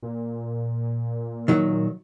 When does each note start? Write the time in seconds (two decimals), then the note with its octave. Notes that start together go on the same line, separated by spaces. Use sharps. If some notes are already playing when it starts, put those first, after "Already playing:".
0.02 A#2
1.48 D#3 F#3